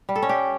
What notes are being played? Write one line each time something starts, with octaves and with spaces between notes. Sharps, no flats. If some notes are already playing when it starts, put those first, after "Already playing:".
G3
A4
C#4
G4